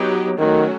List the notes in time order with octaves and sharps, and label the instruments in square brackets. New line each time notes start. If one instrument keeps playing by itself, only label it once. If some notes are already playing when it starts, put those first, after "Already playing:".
Already playing: [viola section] F#3 B3 D#4 G4
[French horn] D#3 [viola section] F#3 A3 C#4 F#4